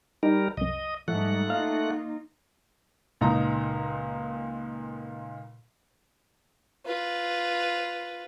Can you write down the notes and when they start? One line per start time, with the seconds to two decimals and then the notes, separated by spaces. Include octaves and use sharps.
0.23 G3 D#4 A#4
0.57 C2 F#2 D#5
1.08 G#2 F3 G3 A3 D#4 F#5
1.50 A#3 D#4 F4 F5
3.21 C#2 A#2 D#4 A#5
6.85 F4 B4